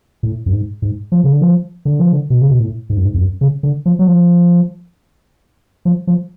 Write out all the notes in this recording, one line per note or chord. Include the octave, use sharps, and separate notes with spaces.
A2
F#2
G#2
G#2
F3
C#3
D3
F3
D3
F3
D3
B2
C#3
B2
A2
G#2
F#2
G#2
F2
F#2
C#3
D3
F3
F#3
F3
F3
F3